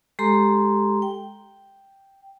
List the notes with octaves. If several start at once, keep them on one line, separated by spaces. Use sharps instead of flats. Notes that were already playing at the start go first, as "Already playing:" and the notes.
G#3 G4 A4 A#5 C6
G5